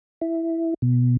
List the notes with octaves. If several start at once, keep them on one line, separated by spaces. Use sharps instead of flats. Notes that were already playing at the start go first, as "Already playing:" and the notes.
E4
B2